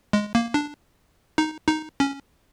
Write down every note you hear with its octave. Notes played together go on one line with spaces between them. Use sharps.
G#3
A#3
D4
D#4
D#4
C#4